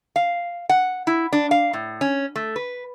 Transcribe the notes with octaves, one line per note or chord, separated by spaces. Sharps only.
F5
F#5
E4
D4
F5
A2
C#4
A3
B4